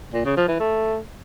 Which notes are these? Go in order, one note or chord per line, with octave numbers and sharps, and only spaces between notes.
A#2
C#3
F3
E3
A3